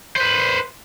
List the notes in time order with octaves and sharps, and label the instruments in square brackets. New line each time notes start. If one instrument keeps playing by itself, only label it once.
[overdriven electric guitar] B4 C5